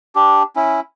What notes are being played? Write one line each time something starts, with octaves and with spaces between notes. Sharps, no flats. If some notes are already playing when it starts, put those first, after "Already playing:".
D4 G4
C#4 E4